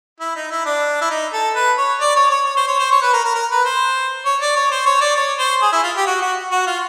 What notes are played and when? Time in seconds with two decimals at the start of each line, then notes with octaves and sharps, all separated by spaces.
0.20 E4
0.36 D#4
0.50 E4
0.66 D4
1.01 E4
1.10 D#4
1.33 A4
1.55 B4
1.78 C#5
2.01 D5
2.16 C#5
2.30 C#5
2.46 C#5
2.57 C5
2.68 C#5
2.79 C5
2.91 C#5
3.02 B4
3.13 A#4
3.25 A#4
3.35 A#4
3.51 B4
3.65 C5
4.26 C#5
4.41 D5
4.56 C#5
4.71 C5
4.86 C#5
5.01 D5
5.16 C#5
5.39 C5
5.62 G#4
5.72 E4
5.83 F4
5.96 G4
6.06 F#4
6.22 F#4
6.51 F#4
6.67 F4